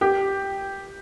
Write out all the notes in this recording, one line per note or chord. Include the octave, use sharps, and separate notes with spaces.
G4